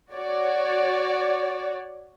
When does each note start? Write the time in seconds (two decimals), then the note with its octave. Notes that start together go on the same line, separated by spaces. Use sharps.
0.15 F#4 C#5 D5